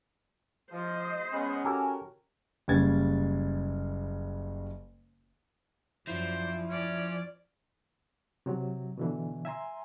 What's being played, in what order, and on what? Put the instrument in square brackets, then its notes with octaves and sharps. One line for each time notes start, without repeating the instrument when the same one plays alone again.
[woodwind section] F3 [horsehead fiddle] C5 D#5
[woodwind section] G#3 B3 [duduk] C#4
[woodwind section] F#4 A#4 [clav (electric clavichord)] G4 A4 G#5
[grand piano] F#1 C#3 G3 B4 G#6 A6
[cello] F#2 D5 [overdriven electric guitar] F3 [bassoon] E4 [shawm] C5
[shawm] C#4 [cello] D5
[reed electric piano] C3 F#3
B2 D3 E3
E5 G#5 A#5 C6